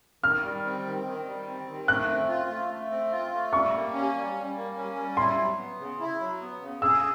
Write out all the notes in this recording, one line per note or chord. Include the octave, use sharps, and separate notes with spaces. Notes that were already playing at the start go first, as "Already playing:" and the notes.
D#3 F6
G3
C4
D#3
D#3
G3
C4
D#3
A3 F#6
C4
F4
A3
A3
C4
F4
A3
G3 C#6
A#3
C#4
G3
G3
A#3
C#4
G3
E4 C6
F#3
B3
C#3
E4
F#3
B3
C#3
G#4 E6